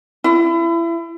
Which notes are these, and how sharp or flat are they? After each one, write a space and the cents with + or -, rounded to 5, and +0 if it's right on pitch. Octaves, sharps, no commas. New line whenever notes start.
E4 +30